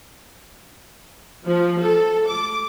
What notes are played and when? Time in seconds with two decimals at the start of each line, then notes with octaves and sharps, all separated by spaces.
1.45 F3
1.79 A4
2.27 D6